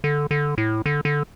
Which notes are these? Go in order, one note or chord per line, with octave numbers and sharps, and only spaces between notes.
D3
D3
A2
D3
D3